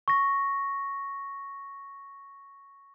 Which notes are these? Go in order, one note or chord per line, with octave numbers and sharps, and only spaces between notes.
C#6 A#6